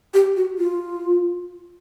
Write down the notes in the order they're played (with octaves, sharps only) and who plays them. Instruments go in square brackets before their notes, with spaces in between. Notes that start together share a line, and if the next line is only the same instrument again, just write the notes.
[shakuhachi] G4
F#4
F4